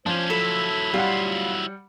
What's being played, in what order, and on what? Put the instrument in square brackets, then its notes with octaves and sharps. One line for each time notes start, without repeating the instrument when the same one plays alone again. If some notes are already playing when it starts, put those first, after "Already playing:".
[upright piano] F3 [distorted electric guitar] C#4 D4 [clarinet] C5
[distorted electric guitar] F#3 E4 [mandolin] A4 [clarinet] B5
[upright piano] G3 F#5 [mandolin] F4